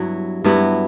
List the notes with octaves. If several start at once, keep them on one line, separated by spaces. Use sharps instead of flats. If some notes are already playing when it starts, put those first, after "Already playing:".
Already playing: G2 F#3 B3 E4
G2 F#3 B3 E4